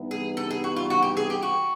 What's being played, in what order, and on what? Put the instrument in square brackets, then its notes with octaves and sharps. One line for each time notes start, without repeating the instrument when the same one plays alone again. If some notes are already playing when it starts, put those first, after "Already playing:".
Already playing: [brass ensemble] G2 E3 G3 B3 D#4
[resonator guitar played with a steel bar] G#4
A4
G#4
F#4
F4
F#4
G4
G#4
G4
F#4